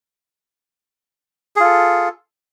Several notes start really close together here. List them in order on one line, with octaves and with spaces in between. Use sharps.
G#4 F4 A4